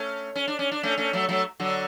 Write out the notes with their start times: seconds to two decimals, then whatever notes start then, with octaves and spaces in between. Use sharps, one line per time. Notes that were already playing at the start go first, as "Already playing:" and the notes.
Already playing: A3 C#4
0.36 C#4
0.48 D4
0.59 C#4
0.72 D4
0.83 A3 C#4
0.98 A3 C#4
1.13 F#3 A3
1.29 F#3 A3
1.60 D3 F#3